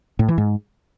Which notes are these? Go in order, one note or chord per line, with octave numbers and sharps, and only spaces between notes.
A2
E3
G#2